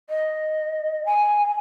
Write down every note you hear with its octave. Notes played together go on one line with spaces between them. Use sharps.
D#5
G#5